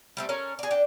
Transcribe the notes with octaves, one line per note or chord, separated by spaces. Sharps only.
G3 A3 C4
C#4 A4 A#4
G#4 D5
D4 G5